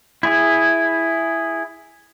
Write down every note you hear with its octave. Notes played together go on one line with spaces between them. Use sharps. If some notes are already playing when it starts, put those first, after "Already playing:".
E4 G#4